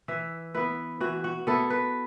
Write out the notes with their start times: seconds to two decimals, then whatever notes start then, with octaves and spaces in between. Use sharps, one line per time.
0.08 E3 E5
0.54 B3 E4 B4
1.01 E3 F#4
1.24 F#4
1.47 B3 E4 A4
1.70 B4